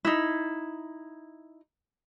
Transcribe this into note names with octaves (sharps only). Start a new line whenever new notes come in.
D#4 E4